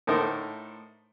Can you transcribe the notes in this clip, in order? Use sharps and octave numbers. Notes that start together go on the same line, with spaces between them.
A2 D3 A3 D#4 A#4 C5